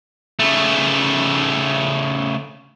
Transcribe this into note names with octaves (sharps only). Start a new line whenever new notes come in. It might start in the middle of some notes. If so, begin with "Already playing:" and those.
C#3 A3